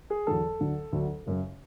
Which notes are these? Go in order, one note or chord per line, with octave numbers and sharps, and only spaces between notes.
G#4
E2 D3 F#3 A4
D2 D3 F#3
D2 D3 F#3
F#1 F#2 C#3